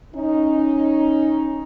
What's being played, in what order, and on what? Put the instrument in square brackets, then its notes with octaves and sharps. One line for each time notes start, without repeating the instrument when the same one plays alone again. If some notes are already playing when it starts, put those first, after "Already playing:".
[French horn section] C#4 D#4